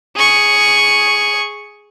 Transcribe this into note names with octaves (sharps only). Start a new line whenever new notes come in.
G#4 C#6